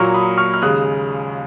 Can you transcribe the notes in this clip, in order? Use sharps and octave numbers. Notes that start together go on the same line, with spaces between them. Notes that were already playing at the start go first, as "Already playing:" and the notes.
Already playing: A#2 F#3 A#3 C#6 F6
B5 D#6
C#6 F6
F6
D#2 C#3 G#3 D#6 F#6